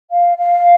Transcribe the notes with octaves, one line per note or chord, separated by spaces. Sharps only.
F5
F5